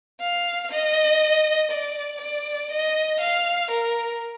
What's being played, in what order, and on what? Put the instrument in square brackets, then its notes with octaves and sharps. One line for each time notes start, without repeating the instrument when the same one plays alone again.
[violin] F5
D#5
D5
D5
D#5
F5
A#4